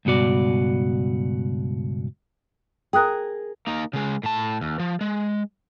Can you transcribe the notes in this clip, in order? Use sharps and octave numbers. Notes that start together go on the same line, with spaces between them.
C#2 G2 B2 F#4 D5
G#4 A#4 G5 D#6 F#6
A#3 D#4
C#3 G#3
A2 A5
D#2
F3
G#3